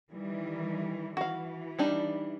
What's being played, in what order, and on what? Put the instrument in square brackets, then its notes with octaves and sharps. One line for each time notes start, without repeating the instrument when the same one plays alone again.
[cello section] D#3 E3 G3
[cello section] E3 [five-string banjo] F#4 F5
[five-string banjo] G3 D4 D#4